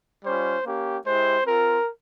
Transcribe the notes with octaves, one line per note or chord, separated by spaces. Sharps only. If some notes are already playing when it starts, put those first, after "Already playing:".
G3 C#4 F4 C5
A#3 C#4 G4
G#3 E4 G4 C5
C4 F4 A#4